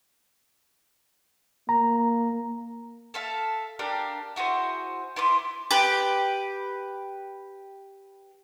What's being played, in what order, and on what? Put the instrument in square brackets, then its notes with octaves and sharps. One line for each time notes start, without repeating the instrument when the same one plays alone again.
[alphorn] A#3 [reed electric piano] A#5
[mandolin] A4 E5 F5
D4 G4 A#4 F5
E4 F#4 G#4 C5
E4 B4 C6 D6
G4 B4